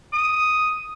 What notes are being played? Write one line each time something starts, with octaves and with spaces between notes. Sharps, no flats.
D#6